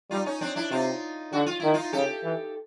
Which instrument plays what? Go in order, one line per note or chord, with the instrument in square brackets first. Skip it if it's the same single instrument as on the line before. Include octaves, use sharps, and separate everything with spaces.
[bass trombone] G3 [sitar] D#4 F4
[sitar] C#4 D#4
C4 D4
D4 E4
[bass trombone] C3 [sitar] D#4 F4
[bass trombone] D3 [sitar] F#4
[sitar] F4
[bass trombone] D#3 [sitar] E4
[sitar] D#4 F4
[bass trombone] C#3 [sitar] G4 A4
[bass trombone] E3